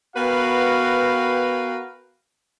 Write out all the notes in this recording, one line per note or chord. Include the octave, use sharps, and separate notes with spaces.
B3 F#4 A#4 B4 F5 G5